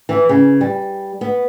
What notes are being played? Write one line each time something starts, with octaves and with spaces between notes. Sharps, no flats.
E3
C#3
G3
B3